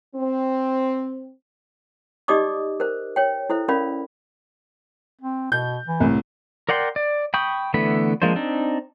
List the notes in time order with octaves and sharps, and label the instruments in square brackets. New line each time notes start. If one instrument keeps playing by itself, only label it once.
[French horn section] C4
[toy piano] D#4 G4 D5 D#5 D6 D#6
A#4 C5
C#5 G5
E4 A4 C5 E5
C#4 A#4 D5 F5 B5
[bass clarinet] C4
[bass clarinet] B2 [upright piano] G6
[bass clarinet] E3
[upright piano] C2 A2
[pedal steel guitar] A#4 D5 F#5 G5 C6
D5
G5 B5 C#6 D#6 G6
D3 E3 A3 B3 B5
F3 G#3 A#3 D4 C5
C4 D4 D#4